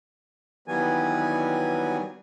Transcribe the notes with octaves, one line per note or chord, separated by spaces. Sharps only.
D#2 E3 F#3 G3 B3 G#5